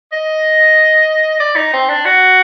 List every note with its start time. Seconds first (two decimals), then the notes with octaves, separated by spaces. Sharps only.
0.12 D#5
1.40 D5
1.56 D#4
1.74 C4
1.90 D4
2.05 F#4